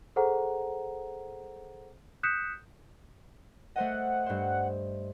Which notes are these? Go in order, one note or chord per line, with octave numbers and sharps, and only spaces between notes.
G#4 A4 C5 F#5 A#5
D#6 F#6 G6 B6 C#7 E7
A3 C5 D#5 F#5
G2 C5